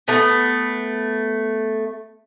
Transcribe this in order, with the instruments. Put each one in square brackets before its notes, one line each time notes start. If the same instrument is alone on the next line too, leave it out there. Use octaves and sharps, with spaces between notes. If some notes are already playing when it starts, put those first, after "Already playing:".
[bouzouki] A3 B3